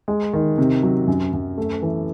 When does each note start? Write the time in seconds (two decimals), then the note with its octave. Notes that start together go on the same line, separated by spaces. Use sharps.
0.08 G#3
0.33 D#3
0.58 C3
0.83 F#3
1.07 F#2
1.33 F#2
1.58 A3
1.82 E3